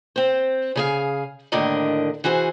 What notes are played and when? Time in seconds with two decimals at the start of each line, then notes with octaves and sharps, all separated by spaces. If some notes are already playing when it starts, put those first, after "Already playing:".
0.16 C4 C5
0.76 C#3 G#4 F5
1.52 D#2 A2 D3 D4 A#4 D#5
2.24 E3 F#4 G#4 C5